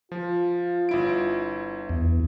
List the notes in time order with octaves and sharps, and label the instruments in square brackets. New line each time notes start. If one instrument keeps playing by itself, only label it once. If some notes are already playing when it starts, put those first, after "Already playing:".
[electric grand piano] F3 [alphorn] F4
[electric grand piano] G1 E4 D7
[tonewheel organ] E2